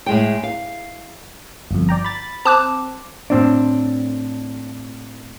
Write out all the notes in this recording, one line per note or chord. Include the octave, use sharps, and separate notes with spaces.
A2 G#3 G5
F5
G1 F2
D5 G5 A#5
B5 A6
C4 A5 D6 F#6
A2 C4 D4